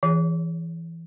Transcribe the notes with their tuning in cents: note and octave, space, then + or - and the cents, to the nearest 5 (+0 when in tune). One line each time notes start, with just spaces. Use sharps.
E3 +10 G#4 +0 C#5 +0